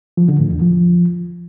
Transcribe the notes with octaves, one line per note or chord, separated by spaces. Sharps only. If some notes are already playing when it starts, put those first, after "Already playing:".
F3
D3
A2
E2
F3